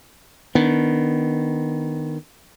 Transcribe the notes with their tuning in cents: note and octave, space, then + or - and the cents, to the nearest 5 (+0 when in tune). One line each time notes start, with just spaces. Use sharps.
D#3 -5 B3 +0 D4 -20